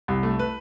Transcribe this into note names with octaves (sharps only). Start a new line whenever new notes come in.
C2
A3
B4